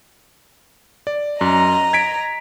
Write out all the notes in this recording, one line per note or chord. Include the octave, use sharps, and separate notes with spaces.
D5
F#2 D#5 A#5
G#6 B6 D7